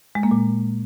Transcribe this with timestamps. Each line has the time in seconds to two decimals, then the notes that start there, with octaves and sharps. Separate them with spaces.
0.15 G#3
0.23 A#3
0.31 A#2